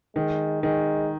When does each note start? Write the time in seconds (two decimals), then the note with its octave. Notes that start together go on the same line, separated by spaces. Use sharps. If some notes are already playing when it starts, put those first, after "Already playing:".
0.16 D#3 G#3
0.62 D#3 G#3